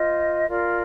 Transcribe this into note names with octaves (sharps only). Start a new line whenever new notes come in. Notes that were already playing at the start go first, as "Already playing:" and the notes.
Already playing: F4 C5 D#5
F4 A#4 D5